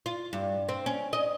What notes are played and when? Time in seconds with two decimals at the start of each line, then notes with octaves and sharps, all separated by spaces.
0.06 F4
0.33 G2
0.69 C4
0.86 C#4
1.13 D#5